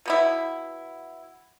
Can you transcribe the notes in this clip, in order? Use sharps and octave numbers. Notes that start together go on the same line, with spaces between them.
B2 B3 E4